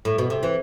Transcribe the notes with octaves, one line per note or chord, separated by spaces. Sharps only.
A2
B2
C3
E3